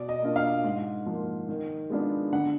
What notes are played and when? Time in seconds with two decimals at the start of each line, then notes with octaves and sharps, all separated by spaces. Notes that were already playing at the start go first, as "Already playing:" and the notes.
Already playing: B2 D5
0.09 D#5
0.22 A#3 D4 F4
0.36 F5
0.64 G#2
1.06 F3 A#3
1.49 D#3
1.90 G#3 B3 D4 F4
2.33 D3 F#5